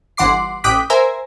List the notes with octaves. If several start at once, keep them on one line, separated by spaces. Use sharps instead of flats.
G1 E3 F#5 C6 D6 C7
A1 G5 D6 D#6 F#6 B6
A#4 C5 E5 G#5 A#5